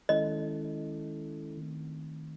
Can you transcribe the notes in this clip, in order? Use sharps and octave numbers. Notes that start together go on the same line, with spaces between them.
D#3 G#3 C#4 E4 A4 D#5
D#3 A3 C4